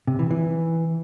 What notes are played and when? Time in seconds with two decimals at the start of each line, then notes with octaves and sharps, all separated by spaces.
0.08 C3
0.19 E3
0.31 E3